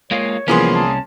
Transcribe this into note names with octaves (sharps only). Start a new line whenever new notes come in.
G#3 A#3 F4 C#5
C2 E3 F3 A#3 B3 C#4 G#4 C6
A5